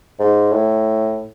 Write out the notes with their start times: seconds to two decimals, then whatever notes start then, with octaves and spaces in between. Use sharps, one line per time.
0.20 G#2
0.52 A2